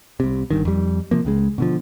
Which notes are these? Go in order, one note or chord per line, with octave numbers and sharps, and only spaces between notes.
C2 C3
G1 C2 G2 D#3
F2 G3
C3 F3 A#3
C#2 C#3 G#3
B2 D3 F3